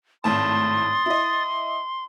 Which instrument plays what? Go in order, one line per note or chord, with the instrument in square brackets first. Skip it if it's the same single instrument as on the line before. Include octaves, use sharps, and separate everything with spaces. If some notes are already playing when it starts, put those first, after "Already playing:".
[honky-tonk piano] G#1 A2 A5 [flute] C6 [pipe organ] D#6 A6
[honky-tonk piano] E4 D#5